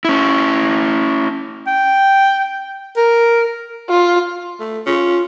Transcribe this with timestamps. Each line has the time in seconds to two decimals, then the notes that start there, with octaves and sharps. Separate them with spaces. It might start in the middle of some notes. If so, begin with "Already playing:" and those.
0.05 C#4 E4
1.67 G5
2.97 A#4
3.90 F4
4.60 A3
4.86 C#4 F4